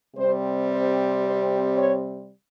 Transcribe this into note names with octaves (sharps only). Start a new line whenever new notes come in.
C3 G3 C4 C5
C5
C5
C#5